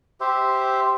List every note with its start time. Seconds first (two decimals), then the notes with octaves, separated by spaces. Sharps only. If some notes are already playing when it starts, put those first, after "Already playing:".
0.20 G4 C5 E5